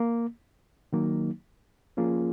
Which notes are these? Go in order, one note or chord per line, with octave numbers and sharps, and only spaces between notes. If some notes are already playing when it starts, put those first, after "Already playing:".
Already playing: A#3
D#3 F#3 A#3 D#4
F3 A#3 C#4 F4 G#4